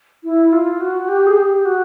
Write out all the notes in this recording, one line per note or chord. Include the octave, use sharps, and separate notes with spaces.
E4
F4
F#4
G4
G#4
G4
F#4